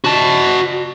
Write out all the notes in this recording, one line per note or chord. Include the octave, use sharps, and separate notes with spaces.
F#4 A5